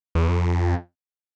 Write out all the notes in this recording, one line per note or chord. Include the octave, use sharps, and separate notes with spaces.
E2
F2